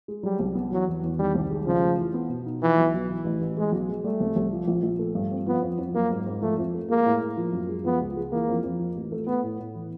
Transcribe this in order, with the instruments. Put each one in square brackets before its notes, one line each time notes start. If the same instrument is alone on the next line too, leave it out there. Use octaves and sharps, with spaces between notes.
[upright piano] G#3
[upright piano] F#3 [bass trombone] G3
[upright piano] C2
B3
[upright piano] E3 [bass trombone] F#3
[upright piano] E2
E2
[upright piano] D#3 [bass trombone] G3
[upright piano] C2
G#3
[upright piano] C#3 [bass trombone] F3
[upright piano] F1
E3
B3
B2
D#4
[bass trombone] E3 [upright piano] F3
[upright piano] B1
B1
E3
A1
A1
[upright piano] E3 [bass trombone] G#3
[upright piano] B1
G#3
[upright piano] G3 [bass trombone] A3
[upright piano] C2
C2
F3
A#1
A#1
A3
G2
C4
[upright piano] F3 [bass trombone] B3
[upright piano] F2
F2
[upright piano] F#3 [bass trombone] A#3
[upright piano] G#2
G#2
[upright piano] F3 [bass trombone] A3
[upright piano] F2
A3
[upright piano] G#3 [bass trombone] A#3
[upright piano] A2
A2
F3
F#2
G#3
[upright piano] F3 [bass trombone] B3
[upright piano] C#2
G#3
[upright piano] E3 [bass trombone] A#3
[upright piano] F2
F2
F3
A1
A3
[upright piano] A3 [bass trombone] B3
[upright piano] A2
A2
E3